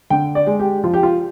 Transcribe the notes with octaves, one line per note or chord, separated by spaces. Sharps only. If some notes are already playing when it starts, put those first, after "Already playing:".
D3 G5
D5
G#3
G4
F3 F4
G4
F4